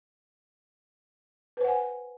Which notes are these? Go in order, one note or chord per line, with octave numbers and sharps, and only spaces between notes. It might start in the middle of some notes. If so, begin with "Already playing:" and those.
B4 C5 F#5 G#5